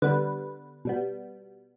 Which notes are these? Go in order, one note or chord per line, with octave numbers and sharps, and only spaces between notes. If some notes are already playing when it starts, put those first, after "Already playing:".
D3 G3 B3 B4
B2 G3 B3